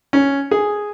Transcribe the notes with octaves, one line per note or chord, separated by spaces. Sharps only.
C#4
G#4